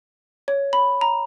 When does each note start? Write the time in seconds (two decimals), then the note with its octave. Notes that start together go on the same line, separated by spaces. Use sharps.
0.48 C#5
0.73 B5
1.01 A#5